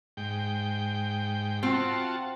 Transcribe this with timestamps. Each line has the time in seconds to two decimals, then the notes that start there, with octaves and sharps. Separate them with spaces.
0.17 G#2 G5
1.63 C4 F4 F#4 A5